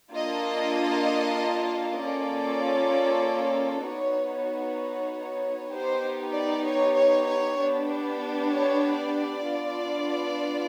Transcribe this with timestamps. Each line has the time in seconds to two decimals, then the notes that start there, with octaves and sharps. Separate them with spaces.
0.13 A#3 D4 F4 A4 D#5
1.99 A#3 C#4 F4 A4 D5
3.86 B3 D#4 F#4 C#5
4.33 C#5
5.72 B3 D#4 G4 C5
6.35 D5
6.66 C#5
6.96 C#5
7.28 C#5
7.59 B3 D4 G4
8.51 C#5
8.98 D5
9.45 B3 D4 F4